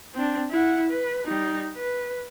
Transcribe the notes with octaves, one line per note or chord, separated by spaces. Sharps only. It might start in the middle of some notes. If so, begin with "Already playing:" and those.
C4 D4
E4 F#5
B4
G3 D#4
B4